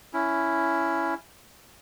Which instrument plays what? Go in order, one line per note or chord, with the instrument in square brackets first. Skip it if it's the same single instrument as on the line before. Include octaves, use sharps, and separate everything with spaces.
[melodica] C#4 E4